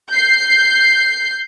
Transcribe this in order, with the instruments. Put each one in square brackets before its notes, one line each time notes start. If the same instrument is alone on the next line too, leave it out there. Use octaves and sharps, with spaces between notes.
[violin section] G6 C7